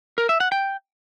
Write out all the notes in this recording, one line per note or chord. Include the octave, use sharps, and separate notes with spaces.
A#4
E5
F#5
G5